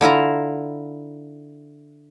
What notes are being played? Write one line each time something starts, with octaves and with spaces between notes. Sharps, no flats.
D3 E4 F4 A#5